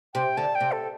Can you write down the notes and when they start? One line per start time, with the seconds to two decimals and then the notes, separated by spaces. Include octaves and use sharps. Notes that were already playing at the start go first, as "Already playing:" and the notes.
0.14 C3 G5
0.37 D3 A5
0.55 G5
0.60 C3
0.72 A4